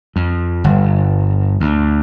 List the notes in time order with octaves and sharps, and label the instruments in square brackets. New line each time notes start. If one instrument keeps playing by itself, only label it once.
[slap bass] F2
G1
D2